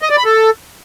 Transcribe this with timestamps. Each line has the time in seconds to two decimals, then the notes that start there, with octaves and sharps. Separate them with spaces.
0.02 D#5
0.10 D5
0.17 B5
0.25 A4